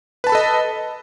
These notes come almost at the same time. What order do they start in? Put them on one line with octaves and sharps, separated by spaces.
B4 A5 B5 A4 D#5